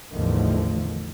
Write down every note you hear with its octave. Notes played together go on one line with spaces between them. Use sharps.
A1 E2 D3 D#3 F3 A3